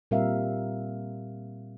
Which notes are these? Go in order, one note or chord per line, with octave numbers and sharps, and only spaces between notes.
A#2 G3 C4 A#4 E5 F5